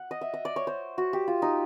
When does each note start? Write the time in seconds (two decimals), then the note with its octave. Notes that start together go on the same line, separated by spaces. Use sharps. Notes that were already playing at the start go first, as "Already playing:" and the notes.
Already playing: F#5
0.11 D#5
0.21 E5
0.34 D#5
0.45 D5
0.56 C#5
0.67 C5
0.98 F#4
1.13 G4
1.28 F4
1.42 D#4